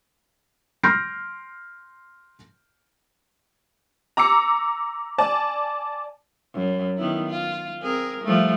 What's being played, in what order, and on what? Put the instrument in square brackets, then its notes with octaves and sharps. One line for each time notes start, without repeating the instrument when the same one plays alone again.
[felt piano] C6 F6 G6 A#6 C7 D7
[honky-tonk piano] A#5 D6 E6 C#7
D5 G#5 A5
[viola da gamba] F#2
D#3 B3 E4
F4
C4 G#4 A#4
F3 G3 A3